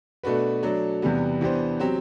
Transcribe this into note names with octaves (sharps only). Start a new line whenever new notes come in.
B2 A3 D4 F#4 B4
F#3 A3 D4
E2 C3 G3 B3
E3 B3 D4 G4 C5
F#3 C4 G4